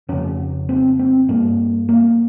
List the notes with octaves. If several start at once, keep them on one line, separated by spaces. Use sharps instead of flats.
F2 C#3 C#4
C4
C4
G2 A#3
A#3